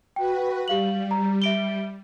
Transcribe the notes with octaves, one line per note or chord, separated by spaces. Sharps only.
F#4 B4 G5
G3 G4 F5 F#7
A#5
E5 D7 G7